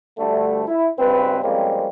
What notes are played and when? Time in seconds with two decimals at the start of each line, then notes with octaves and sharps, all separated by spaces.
0.19 D2 D3 G3 A3
0.68 E4
0.99 G#1 C#2 G2 C4 B4
1.43 F2 G3 G#3 A#3 C4 C#4